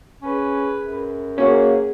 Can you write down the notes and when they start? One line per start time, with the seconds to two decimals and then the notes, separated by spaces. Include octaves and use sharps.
0.22 C#4 G#4 B4
0.80 F#2
1.38 A#3 C#4 F#4 G#4